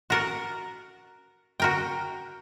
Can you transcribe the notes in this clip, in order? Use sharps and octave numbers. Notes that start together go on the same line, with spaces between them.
F#4 A#4 F#5
F#4 A#4 G5